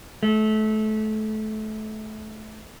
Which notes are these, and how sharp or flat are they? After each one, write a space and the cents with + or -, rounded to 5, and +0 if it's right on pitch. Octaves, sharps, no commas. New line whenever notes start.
A3 -25